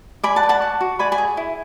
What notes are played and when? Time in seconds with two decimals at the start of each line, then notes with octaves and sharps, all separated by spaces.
0.24 D5 G#5 B5
0.36 F#5 A5
0.43 B4
0.49 F#5 A5
0.62 F#4
0.81 F#4
0.99 D5 G#5 B5
1.12 G#5 B5
1.18 G#4
1.37 E4